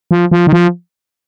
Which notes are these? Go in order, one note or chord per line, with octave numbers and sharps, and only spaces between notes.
F3
F3
D#3
F3